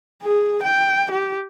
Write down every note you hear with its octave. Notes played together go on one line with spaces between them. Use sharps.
G#4
G5
G4